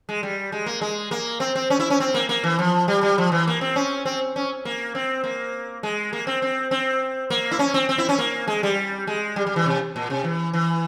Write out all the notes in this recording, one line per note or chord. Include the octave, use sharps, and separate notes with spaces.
G#3
G3
G#3
A#3
G#3
A#3
C4
C4
C#4
E4
C#4
C4
A#3
A#3
E3
F3
G3
G3
F3
E3
A#3
C4
C#4
C4
C#4
A#3
C4
A#3
G#3
A#3
C4
C4
C4
A#3
E4
C#4
C4
C4
E4
C#4
A#3
G#3
G3
G#3
G3
G3
E3
C3
A#2
C3
E3
E3